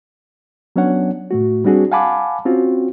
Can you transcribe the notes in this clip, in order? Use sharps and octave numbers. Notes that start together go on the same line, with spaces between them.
F#3 B3 C#4 D4 C#5 F#5
A2 A3 F#4
G3 C4 D4 F#4 G#4
F5 F#5 G#5 A5 B5 D6
C4 C#4 F4 F#4